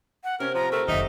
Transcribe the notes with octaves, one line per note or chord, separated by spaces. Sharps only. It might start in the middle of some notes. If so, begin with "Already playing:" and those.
F#5
C3 C#4 A#4
F3 A#5
A3 A#4 G5 A5
F#1 D#3 D#4 E5 F#5 D6